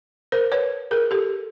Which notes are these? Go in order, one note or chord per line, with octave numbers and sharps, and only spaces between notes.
A#4 C5
B4 C#5
G#4 A#4
G4 A4